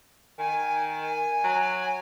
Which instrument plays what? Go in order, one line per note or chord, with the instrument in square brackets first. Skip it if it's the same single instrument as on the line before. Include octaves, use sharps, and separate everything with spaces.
[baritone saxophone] D#3 [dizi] G#5
[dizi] G#5
[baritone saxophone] F#3